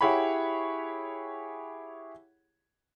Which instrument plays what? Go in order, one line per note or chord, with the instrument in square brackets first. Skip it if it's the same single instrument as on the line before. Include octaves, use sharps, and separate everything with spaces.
[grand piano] E4 G4 G#4 C#5 F#5 B5